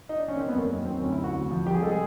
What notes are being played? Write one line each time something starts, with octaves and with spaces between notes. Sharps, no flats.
D#4
D4
C#4
D#3 C4
B3
F#2
A#3
D#3
F#2 C4
D2 C#4
E4
C3
F#4
D2
F3
C2 G4
G#4
G#3 A4
G#4